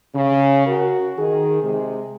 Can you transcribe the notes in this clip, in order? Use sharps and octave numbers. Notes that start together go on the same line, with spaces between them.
C#3
F#4 A#4
D#3 G#4
C3 G#3 G#4